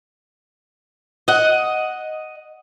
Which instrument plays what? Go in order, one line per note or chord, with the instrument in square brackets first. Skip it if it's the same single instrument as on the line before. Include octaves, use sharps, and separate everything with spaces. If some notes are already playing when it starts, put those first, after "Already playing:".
[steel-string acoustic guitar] D#5 F#5